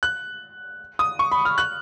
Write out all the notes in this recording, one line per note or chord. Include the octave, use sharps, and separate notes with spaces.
F#6
D#6
C#6
B5
F6
F#6